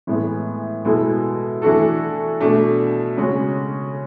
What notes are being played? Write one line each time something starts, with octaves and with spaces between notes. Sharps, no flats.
A2 E3 G#3 B3
B2 G#3 B3 E4 A4
E3 A3 D4 F#4 A4
B2 A3 D4
C#3 G#3 C#4 F#4